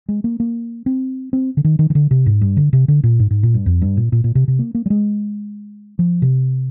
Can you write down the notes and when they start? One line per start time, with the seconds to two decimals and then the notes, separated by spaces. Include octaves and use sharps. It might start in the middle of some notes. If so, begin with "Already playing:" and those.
0.09 G#3
0.24 A#3
0.40 A#3
0.86 C4
1.33 C4
1.57 D3
1.64 D#3
1.79 D#3
1.90 D#3
1.95 D3
2.11 C3
2.26 G#2
2.41 G2
2.57 D3
2.73 C3
2.88 D3
3.04 A#2
3.19 G#2
3.31 G#2
3.43 A#2
3.54 G2
3.66 F2
3.82 G2
3.97 A#2
4.12 A#2
4.24 A#2
4.35 C3
4.48 C3
4.59 A#3
4.75 A#3
4.86 G3
4.90 G#3
5.99 F3
6.22 C3